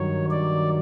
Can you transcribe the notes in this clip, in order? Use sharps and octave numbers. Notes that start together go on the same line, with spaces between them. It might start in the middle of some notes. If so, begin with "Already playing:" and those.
Already playing: G2 D#3 F#3 C#5
D5